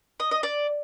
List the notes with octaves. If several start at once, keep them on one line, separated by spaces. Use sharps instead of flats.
D#5
D#5
D5